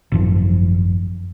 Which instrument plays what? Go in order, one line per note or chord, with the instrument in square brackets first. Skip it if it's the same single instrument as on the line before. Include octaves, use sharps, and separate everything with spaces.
[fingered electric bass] G#1 F#2 F3